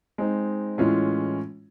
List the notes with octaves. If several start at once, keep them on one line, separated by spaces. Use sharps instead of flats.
G#3 C4 D#4
A2 E3 G#3 C#4 F4